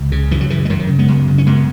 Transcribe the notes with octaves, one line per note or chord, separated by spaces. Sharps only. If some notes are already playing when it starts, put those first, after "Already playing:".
Already playing: C#2
C#3
F#2 E3
F#3
C#3 E3
G#3
F#2 D#3 F#3
D#3
C#3
G#3 B3
F#2
C#3
C#4
F#2 G#3 B3